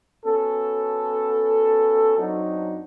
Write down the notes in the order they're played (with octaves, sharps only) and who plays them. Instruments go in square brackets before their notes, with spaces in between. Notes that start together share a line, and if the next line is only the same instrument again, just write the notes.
[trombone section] B3 C#4 F#4 A4
F#2 F#3 C4 D4 D#4 F#4